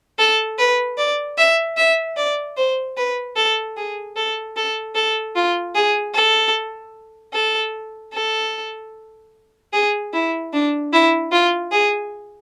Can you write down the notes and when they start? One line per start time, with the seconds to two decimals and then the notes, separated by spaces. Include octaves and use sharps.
0.19 A4
0.58 B4
0.98 D5
1.38 E5
1.77 E5
2.17 D5
2.57 C5
2.97 B4
3.36 A4
3.76 G#4
4.16 A4
4.56 A4
4.95 A4
5.35 F4
5.75 G#4
6.15 A4
7.34 A4
8.14 A4
9.73 G#4
10.13 E4
10.53 D4
10.93 E4
11.32 F4
11.71 G#4